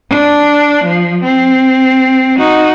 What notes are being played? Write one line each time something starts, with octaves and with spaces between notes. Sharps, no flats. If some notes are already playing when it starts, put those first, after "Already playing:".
D4
F3
C4
D#4 F#4